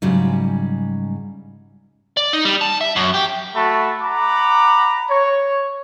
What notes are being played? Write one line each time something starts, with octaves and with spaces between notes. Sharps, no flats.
G#2 C#3 F#3 G3
D5
D#4
G3
A5
E5
F#2
G4
A3 F#4 A5 B5
F#5 A#5 B5 D6
C#5